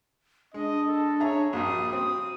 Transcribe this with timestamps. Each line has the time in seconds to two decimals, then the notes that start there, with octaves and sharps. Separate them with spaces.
0.54 G#3 D4 D#5
0.88 A4
1.20 G#4 C#5 E5 A#5
1.53 A#1 G2 F#4 D#6
1.93 C4 D#6